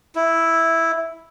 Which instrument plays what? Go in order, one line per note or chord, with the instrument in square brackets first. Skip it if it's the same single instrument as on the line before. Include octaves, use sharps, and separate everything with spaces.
[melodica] E4